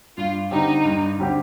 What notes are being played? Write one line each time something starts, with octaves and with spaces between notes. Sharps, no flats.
G2 F4
D3 G3 C4 D#4 G4
G2
D3 G3 C4 G4